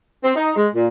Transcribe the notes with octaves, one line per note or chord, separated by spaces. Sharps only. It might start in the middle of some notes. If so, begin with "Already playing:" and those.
C4
D#4
G#3
A#2